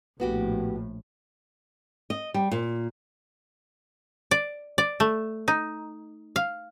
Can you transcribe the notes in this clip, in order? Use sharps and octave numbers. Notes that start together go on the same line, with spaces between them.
A#1 A2 B3 F#4 G4
D#5
G3
A#2
D5
D5
A3
D#4
F5